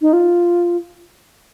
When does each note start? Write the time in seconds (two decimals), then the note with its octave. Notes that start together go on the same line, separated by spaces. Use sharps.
0.02 D#4
0.13 F4